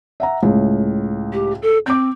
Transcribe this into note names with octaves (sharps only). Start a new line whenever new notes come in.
E5 F#5 A#5
C#2 A2
G4
A4
C4 D6 G6